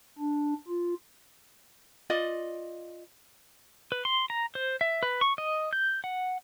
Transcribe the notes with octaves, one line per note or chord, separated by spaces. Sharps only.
D4
F4
F4 D5 D#5
B4
C6
A#5
C5
E5
B4
C#6
D#5
G6
F#5